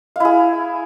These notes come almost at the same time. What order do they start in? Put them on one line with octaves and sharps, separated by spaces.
F5 E4 G#4